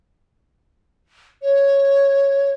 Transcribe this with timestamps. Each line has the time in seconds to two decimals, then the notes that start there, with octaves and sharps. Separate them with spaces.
1.42 C#5